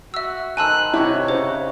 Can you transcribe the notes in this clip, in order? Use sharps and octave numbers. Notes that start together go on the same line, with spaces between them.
F#4 E5 E6
D#3 C5 G#5 A5 B5 E6 F#6
C3 E4 F#4 G4 C#5
C#3 C5